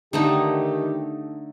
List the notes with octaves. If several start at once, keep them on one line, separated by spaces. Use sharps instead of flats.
D3 D#3 A3 D#4 G4